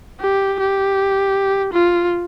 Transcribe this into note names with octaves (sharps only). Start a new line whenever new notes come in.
G4
G4
F4